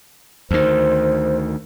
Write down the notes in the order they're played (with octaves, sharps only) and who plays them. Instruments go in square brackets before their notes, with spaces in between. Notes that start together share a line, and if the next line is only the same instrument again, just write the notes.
[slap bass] D2 D#3 [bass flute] C5